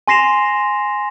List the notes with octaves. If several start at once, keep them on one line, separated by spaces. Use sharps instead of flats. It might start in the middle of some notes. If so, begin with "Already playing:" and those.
G#5 C6 A#6 C7 E7 F7